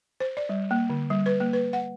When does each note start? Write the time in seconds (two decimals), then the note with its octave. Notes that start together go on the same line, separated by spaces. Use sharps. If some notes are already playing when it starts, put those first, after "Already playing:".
0.20 C5
0.37 D5
0.49 G3
0.71 A#3
0.90 D3
1.10 G3
1.26 B4
1.40 A#3
1.53 B4
1.73 F#5